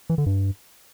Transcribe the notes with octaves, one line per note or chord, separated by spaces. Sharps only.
E3
D3
G2